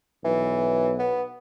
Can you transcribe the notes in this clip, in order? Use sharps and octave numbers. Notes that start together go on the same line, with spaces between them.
B1 E3
B3